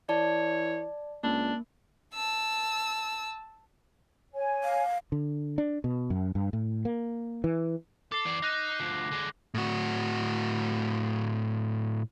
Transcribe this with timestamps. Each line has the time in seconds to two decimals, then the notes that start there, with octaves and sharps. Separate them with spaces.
0.09 E3 C#5 D5 A5
1.23 C#2 A#3 D4
2.14 A5 E6
4.33 C#5 G#5
4.64 F5
5.12 D3
5.58 D4
5.84 B2
6.10 F#2
6.35 G2
6.53 A2
6.85 A#3
7.44 E3
8.12 A4 D6 C7
8.25 E3 D5
8.42 D#4 F#6 A#6
8.79 D2 F3
9.11 D3 G#3
9.54 A2 F#4